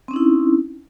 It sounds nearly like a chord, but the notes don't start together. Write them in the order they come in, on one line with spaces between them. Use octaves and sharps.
C4 C#4 D#4 E4